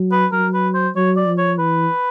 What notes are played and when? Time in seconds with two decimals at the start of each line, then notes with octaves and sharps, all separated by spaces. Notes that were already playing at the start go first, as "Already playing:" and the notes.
Already playing: F#3
0.12 B4
0.32 F#3 A#4
0.54 B4
0.74 C5
0.96 F#3 C#5
1.17 D5
1.27 F3
1.38 C#5
1.59 E3 B4